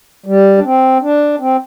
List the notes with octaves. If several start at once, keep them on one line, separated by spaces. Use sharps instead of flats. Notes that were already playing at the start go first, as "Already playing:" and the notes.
G3
D4
C4
D4
C4